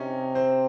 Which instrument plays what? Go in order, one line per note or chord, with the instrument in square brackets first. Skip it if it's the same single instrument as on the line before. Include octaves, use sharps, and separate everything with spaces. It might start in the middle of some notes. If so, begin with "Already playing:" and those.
Already playing: [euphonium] C3 [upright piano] C#4 D#4 C#5
[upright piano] C4 C5